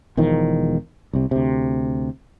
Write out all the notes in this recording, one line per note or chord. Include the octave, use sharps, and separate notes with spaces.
E1 E2 D#3 F3
C2 C3
D2 C3